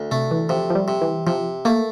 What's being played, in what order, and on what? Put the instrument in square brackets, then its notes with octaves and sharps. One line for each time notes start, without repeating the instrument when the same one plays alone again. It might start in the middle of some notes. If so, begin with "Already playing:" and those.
Already playing: [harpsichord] D2
[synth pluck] C3 [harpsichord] A3
[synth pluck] E3
[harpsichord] C3 [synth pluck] F3
[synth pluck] F3
G3
[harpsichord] C3
[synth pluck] E3
[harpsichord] C3 [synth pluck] F3
[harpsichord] A3 [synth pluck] A#3